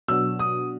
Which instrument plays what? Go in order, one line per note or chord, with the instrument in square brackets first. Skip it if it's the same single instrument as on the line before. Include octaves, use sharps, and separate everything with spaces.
[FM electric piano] B2 F#3 B3 D4 F#4 [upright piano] E6
[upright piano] D#6